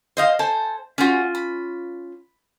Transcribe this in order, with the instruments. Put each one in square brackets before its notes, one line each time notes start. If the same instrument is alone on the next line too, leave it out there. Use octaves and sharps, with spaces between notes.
[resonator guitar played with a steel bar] C5 D#5 F5
[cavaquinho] A4 G#5 A5 [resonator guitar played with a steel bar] C5
[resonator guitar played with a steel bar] C#4 F4 [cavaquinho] F#4 G#4 C5
[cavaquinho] B5